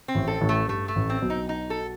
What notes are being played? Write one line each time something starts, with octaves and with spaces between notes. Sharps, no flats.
C4
A1 A2
A4
A1 A2
A3
G2 A3
A3
A1 A2
C4
B1 B2
D#4
D#4
A4